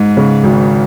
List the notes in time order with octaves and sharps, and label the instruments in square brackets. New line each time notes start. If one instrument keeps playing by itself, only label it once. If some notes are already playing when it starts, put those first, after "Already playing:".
Already playing: [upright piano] G#2
C#3
G#1